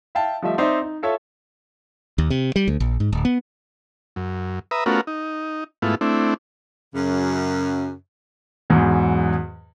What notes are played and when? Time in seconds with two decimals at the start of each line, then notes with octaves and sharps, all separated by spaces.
0.15 E5 F5 G5 A5
0.43 F3 G3 A3 D#5 E5
0.58 C4 D#4 C5 D5 E5 C6
0.82 D#4
1.03 F4 A4 C#5 E5
2.18 D#2
2.30 C3
2.56 G3
2.68 D2
2.80 A#1
3.00 G#2
3.13 D1
3.25 B3
4.16 F#2
4.71 B4 E5 A#5 D#6
4.86 A3 B3 C#4 F4 F#4 A#4
5.07 D#4
5.82 G#2 A3 B3 E4 F4
6.01 A3 C4 D4 E4
6.95 F#2 C#3
8.70 E2 G#2 F#3